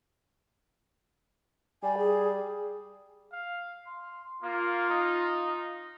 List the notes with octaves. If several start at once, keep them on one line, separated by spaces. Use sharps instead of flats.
G3 G#5
G#4
F5
C6
A#3 F4
D#4